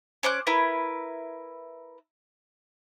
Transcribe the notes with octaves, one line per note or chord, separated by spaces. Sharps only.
C#4 C5 D6 F#6
E4 A#4 B4